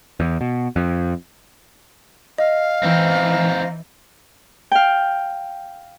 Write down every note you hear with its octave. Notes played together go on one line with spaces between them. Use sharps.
E2
B2
F2
D#5 F5
E3 C4 D#4
F5 G5